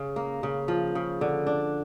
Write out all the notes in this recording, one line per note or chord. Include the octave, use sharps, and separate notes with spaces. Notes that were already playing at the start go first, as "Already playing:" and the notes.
Already playing: C#3
A#3
C#3
F3
C#3
D3
D4